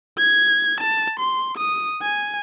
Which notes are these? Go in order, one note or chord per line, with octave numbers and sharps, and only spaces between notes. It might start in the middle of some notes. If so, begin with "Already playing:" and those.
G#6
A5
C6
D#6
G#5